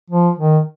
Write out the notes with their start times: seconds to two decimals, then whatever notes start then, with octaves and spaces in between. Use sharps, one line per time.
0.10 F3
0.39 D#3